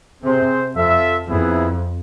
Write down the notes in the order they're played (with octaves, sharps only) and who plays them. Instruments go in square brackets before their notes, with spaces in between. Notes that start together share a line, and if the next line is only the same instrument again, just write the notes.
[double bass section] C3 [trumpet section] C4 G#4 C5
[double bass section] F2 [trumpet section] F4 A4 E5
[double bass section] F2 [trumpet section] B3 E4 G#4 B4 E5